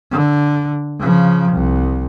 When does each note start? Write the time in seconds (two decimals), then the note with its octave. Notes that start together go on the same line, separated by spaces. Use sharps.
0.11 D3
0.99 C#3 F3
1.52 C2